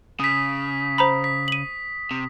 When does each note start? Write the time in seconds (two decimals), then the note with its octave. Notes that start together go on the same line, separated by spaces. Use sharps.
0.20 C#3 D#6 B6
0.98 C5 A#5 B5
1.24 B6
1.48 D#7 F#7
2.11 C3